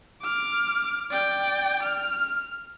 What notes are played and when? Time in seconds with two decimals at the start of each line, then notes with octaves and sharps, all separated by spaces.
0.22 D6 F6
1.11 D5 G5
1.83 F6